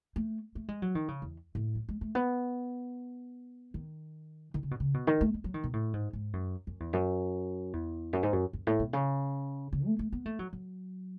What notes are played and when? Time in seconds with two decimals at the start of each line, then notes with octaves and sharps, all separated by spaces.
0.16 A3
0.55 A3
0.68 G#3
0.82 F#3
0.95 D#3
1.08 C#3
1.22 E2
1.55 A2
1.75 F#3
1.89 G#3
2.01 A3
2.15 B3
3.74 D#3
4.54 D#3
4.63 C#3
4.71 B2
4.80 C#3
4.94 B2
5.07 D#3
5.21 A3
5.34 G#3
5.44 F#3
5.54 D#3
5.64 B2
5.73 A2
5.94 G#2
6.13 G#2
6.33 F#2
6.67 F#2
6.80 E2
6.93 F#2
7.73 E2
8.13 F#2
8.23 G#2
8.33 F#2
8.53 F#2
8.67 A2
8.79 B2
8.93 C#3
9.73 C#3
9.86 A3
9.99 A3
10.12 B3
10.26 A3
10.39 F#3
10.53 F#3